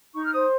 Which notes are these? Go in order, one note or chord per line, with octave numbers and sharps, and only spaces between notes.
D#4 C#6
F6
C5 D#6